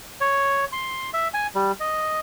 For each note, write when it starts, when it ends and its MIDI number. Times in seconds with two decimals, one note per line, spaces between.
0.21 0.65 73
0.72 1.10 84
1.14 1.28 76
1.34 1.47 80
1.55 1.72 55
1.80 2.20 75